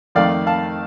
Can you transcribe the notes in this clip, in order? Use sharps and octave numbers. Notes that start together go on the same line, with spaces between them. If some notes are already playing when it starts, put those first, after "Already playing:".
F2 D#3 A3 D5 F5
F5 A5